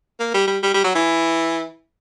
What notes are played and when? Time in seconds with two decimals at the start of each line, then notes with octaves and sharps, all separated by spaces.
0.20 A#3
0.34 G3
0.48 G3
0.63 G3
0.74 G3
0.84 F#3
0.95 E3